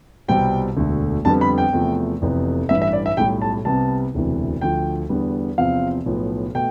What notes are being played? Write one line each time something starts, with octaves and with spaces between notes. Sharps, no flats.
C2 B2 G3 C4 G5
E1 D2 D3 A3
F2 D3 G3 B3 A5
B5
G5
E2 C3 F3 A3
F1 F2 C3 E3 B3
A1 G2 E3 E5
E5
D5
E5
B1 A2 G3 G5
A5
C2 C3 G3 B3 A5
E1 D2 C3 E3
D2 D3 F3 G5
E2 D3 G3 B3
E2 C3 F3 C4 F5
B1 A2 F3 B3
B2 A3 G5